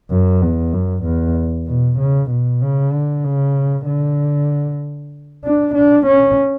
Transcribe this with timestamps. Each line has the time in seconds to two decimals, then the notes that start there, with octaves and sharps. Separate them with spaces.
0.11 F#2
0.42 E2
0.73 F#2
1.04 E2
1.67 B2
1.99 C#3
2.31 B2
2.62 C#3
2.93 D3
3.25 C#3
3.87 D3
5.44 D4
5.75 D4
6.07 C#4